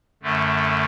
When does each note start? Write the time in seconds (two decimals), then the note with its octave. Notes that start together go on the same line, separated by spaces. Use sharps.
0.23 F#2 D3 A3